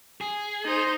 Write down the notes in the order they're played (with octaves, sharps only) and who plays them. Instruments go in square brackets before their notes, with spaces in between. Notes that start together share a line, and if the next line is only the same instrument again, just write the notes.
[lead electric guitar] G#4
[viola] D#4 C5